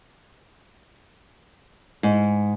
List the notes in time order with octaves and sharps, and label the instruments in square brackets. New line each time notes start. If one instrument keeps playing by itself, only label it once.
[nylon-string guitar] G#2